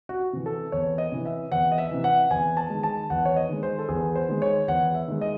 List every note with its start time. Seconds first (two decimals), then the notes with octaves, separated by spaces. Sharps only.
0.09 F#4
0.33 C3 E3
0.46 A4
0.72 E2 C#5
0.98 D#5
1.12 C3 E3
1.25 E5
1.52 E2 F#5
1.72 D#5
1.78 E5
1.91 C3 E3
2.04 F#5
2.31 E2 G#5
2.57 A5
2.70 D#3 G#3
2.83 A5
3.10 E2 F#5
3.25 C#5
3.36 D#5
3.49 D#3 G#3
3.63 C5
3.79 A4
3.89 E2 G#4
4.15 C5
4.29 D#3 G#3
4.42 C#5
4.68 E2 F#5
4.94 E5
5.08 D#3 G#3
5.21 D#5